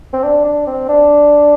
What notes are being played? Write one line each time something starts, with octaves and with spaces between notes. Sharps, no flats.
C4
D4
D4
C4
D4